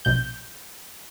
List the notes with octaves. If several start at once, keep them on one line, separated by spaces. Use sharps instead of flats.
A#1 B2 G6